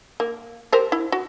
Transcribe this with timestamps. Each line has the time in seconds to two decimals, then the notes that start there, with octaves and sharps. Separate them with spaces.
0.20 A#3
0.73 G4 A#4 C5
0.92 E4
1.12 F#4